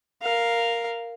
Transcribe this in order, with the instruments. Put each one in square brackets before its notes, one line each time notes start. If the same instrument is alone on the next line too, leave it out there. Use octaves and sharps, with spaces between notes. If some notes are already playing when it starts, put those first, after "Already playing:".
[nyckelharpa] A#4 F5